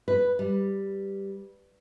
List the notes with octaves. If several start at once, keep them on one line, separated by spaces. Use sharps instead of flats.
B4
G3